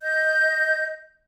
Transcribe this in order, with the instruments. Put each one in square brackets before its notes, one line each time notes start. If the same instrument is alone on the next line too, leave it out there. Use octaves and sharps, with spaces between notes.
[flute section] D#5 G6